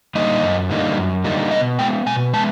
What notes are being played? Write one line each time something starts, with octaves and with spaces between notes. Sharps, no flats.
D3 G3 A#3 D#4 D#5
F#2
D3 G3 A#3 D#4
F#2
D3 G3 A#3 D#4
B2 D#5
G#3 B3 G5
B2 G#5
G#3 B3 A5